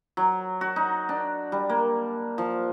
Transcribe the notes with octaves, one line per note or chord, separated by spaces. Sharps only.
F#3
F#4
D#4
D4
G3
A#3
F3